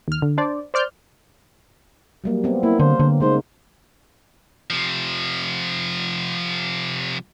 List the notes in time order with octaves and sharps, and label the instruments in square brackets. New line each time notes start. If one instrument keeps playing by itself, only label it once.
[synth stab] D#2 F6
D3
D4 C5 D5
C5 D5 F6 G6
[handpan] F#3 G3 A#3
B3 C4
[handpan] A#3 [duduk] E4
[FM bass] D3 [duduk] C5
[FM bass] D3
[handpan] C#3 G#3 D#4 [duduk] C5
[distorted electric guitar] C3 F3